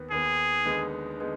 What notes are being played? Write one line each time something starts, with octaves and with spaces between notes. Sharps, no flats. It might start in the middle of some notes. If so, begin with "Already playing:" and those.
Already playing: D#2 D#3 B3
D#2 D#3 B3 G#4
D#2 D3 G#3 B3 D#4
D3 G#3 B3 D#4